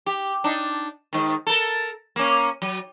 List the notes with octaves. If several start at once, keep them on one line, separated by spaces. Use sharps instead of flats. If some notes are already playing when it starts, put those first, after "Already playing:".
G4
D4 D#4
G#2 D#3
A4 A#4
A#3 C#4
F#3